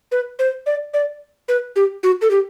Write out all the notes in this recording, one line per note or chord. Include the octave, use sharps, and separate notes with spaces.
B4
C5
D5
D5
B4
G4
F#4
A4
G4